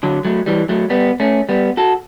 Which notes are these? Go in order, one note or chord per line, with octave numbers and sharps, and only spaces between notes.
D3 F#3
F#3 A3
E3 G3
F#3 A3
G3 B3
A3 C#4
G3 B3
F#4 A4